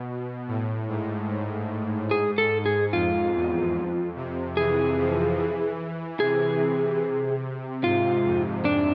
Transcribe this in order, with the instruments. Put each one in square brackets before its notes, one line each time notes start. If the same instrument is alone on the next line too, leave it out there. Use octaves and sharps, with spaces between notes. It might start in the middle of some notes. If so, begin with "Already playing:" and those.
Already playing: [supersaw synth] B2
A2
G#2
G#2
[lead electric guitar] G#4
A4
G#4
[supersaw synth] F2 [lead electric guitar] F4
[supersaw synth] E2
F2
C3
[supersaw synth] E3 [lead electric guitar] G#4
[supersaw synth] F3
E3
[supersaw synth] C3 [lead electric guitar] G#4
[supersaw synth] G#2 [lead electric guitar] F4
[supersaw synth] F2
[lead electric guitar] D4